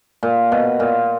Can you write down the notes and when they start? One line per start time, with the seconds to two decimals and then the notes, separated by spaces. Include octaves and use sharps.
0.23 A#2
0.52 B2
0.80 A#2